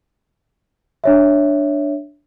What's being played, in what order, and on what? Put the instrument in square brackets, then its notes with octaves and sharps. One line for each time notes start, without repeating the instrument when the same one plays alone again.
[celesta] D4 C#5 E5